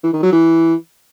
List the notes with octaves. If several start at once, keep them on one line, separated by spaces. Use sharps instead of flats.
E3
D#3
F#3
E3